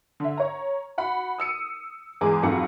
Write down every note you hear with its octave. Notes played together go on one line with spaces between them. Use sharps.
D3 E5
C#5 A#5
F#4 F#5 B5
D#6 E6 C#7 D#7
E2 G#3 G#4 D6
B1 F2 F4 F#4 C#7